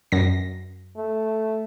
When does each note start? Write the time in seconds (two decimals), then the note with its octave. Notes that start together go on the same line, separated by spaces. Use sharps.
0.12 F#2 A#6
0.97 A3